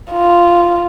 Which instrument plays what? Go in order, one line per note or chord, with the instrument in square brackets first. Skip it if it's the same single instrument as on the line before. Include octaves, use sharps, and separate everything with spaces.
[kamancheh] F4